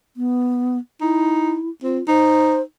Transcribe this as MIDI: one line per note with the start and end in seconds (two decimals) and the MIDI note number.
0.17 0.78 59
1.01 1.58 63
1.01 1.69 64
1.83 1.99 60
1.83 2.06 65
2.08 2.61 63
2.08 2.61 72